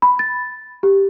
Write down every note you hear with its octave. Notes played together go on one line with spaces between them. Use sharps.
B5
A6
G4